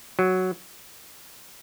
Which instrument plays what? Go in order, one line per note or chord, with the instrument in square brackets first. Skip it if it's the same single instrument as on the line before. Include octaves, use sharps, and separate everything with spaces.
[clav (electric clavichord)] F#3